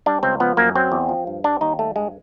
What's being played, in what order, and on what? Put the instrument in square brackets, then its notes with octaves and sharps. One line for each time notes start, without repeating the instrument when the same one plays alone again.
[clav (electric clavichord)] G3 D4
C#2 C4
F3 B3
F#2 A#3
F#3 C4
E2
F3
G2
G3 D4
D#2 D#4
G3 A3
G2 G#3